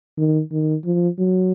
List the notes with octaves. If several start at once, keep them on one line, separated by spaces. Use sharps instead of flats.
D#3
D#3
F3
F#3